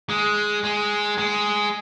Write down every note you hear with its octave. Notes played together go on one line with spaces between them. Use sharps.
G#3
G#3
G#3